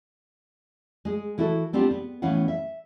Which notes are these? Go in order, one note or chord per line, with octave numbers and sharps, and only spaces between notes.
G#3 G#4
E3 E4 F#4 A4
B3 C4 D4 F4 G4
B3
A2 E3 B3 C#4 F5 F#5
E5